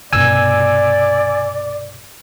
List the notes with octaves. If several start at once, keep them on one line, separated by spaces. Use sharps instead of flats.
C2 G2 B2 D5 G#5 E6